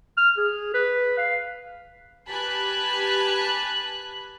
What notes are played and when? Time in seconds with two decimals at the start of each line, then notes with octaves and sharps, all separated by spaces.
0.17 F6
0.37 G#4
0.74 B4
1.18 F5
2.28 G4 B4 G#5 A5 B5 F#6